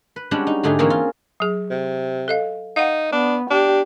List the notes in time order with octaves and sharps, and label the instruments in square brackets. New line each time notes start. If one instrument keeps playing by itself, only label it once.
[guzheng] B4
G3 G#3 B3 C#4 D4 F#4
D#4
G#2 D3 A3 D#4 G4 G#4
E3 A#3 C4 C#4 G#4 A#4
F4
[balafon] F#3 G#4
[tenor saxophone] C3
[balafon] A4 D#5 F5
[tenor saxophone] D#4 [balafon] F5 F#5
[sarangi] B3 [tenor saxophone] D4
[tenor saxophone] D4 [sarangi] G4